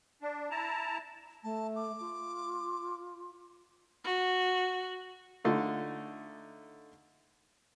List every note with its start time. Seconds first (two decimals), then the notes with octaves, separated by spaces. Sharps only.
0.22 D4
0.51 E4 A5 A#5
1.44 A3 A5
1.75 D6
2.00 F4
4.04 F#4
5.44 D3 A3 D#4 F4